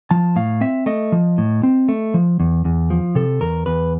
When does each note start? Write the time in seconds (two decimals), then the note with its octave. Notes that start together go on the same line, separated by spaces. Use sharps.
0.11 F3 A5
0.36 A2 F5
0.61 C4 E5
0.86 A3 D#5
1.12 F3
1.38 A2
1.63 C4
1.89 A3
2.14 F3
2.40 E2
2.65 E2
2.90 F3
3.15 C3 A4
3.41 E2 A#4
3.66 E2 B4